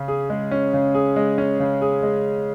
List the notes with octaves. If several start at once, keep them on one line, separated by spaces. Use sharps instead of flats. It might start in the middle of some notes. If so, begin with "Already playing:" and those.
Already playing: C#3 C#4
G#4
G#3
C#4
C#3
G#4
G#3
C#4
C#3
G#4
G#3